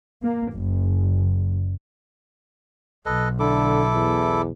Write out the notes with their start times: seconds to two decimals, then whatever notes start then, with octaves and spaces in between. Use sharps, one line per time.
0.22 A#3
0.53 F#1
3.06 B1 A4 B4 D#5
3.40 D3 E4 A4 D6
3.94 E2